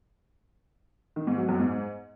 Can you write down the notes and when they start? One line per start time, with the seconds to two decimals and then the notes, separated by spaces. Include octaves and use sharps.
1.16 D#3
1.27 G#2
1.38 F#3
1.49 F#2
1.59 G#2